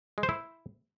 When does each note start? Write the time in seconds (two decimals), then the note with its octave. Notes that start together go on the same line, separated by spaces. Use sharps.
0.18 G#3
0.23 C5
0.29 E4